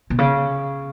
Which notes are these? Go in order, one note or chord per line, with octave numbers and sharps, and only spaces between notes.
B2
C#3